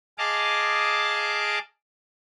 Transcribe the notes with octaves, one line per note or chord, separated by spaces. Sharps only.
G#4 D#5 F5 A5 D6